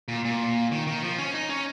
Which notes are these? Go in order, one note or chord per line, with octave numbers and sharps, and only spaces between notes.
A#2
A#2
D#3
D#3
F3
C#4
D#4
C#4